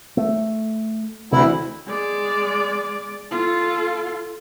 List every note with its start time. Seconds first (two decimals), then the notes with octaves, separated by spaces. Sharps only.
0.17 A3
1.32 D2 C3 E3 E4
1.87 G#3 D5
3.31 F4 A4